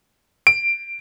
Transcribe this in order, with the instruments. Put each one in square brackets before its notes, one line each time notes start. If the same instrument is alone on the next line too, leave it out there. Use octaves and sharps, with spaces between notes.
[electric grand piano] D7